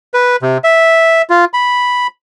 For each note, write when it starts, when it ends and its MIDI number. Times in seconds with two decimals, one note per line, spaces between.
0.14 0.36 71
0.42 0.58 48
0.64 1.22 76
1.30 1.45 65
1.54 2.07 83